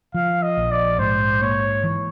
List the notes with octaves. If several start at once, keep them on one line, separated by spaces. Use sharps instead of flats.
F3 F5
D#5
A#1
D5
G#2 C5
A#3 C#5
E3